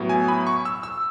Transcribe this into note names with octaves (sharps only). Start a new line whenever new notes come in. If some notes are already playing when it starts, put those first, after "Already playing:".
Already playing: A2 F#3 B3
G#5
B5
C#6
E6
E6